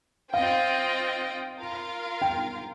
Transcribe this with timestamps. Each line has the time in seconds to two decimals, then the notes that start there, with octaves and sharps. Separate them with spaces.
0.33 C4 F4 D#5 F5 G5
1.59 F4 A#4 F5
2.22 G5